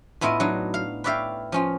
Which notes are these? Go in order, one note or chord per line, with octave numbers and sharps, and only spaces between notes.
A2 B3 E4 F4 D#5
F#3 D4 D#4
F5
B4 C#5 D5 E5 F5 G5
F3 C#4 F4